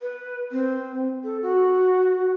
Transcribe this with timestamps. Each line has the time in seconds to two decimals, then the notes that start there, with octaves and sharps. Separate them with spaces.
0.01 B4
0.52 C4
1.24 A4
1.42 F#4